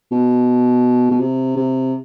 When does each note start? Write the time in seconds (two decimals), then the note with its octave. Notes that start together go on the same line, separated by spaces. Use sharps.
0.11 B2
1.11 B2
1.20 C3
1.56 C3